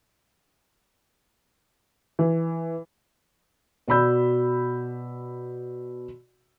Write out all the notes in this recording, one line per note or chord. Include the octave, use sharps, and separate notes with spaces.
E3
B2 F#4 D5 B5 E6 G6